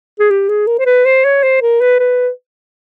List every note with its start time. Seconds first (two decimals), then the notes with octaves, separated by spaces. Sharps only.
0.19 G#4
0.30 G4
0.49 G#4
0.67 A#4
0.79 C5
0.86 B4
1.05 C5
1.24 C#5
1.43 C5
1.62 A#4
1.81 B4
1.99 B4